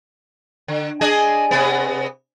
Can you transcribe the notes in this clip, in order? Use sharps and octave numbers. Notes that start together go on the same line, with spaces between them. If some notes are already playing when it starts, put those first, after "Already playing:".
D3
D4 G#4 D#5
C3 B3